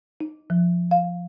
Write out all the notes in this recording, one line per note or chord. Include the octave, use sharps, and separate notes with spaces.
D#4
F3
F5